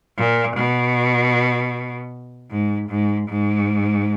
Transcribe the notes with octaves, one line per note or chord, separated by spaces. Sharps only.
A#2
B2
G#2
G#2
G#2